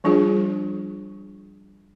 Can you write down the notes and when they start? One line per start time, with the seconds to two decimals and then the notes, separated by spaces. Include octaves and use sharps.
0.04 F3 G3 D4 F4 G#4